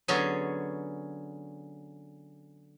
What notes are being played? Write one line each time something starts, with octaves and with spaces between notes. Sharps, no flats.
D3 F#3 B3 C#4 G#4